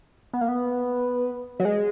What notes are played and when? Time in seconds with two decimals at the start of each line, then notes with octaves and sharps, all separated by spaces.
0.33 B3
0.41 A#3
0.48 B3
1.60 F#3
1.65 G#3